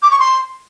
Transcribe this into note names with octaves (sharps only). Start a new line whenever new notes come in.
D6
C#6
C6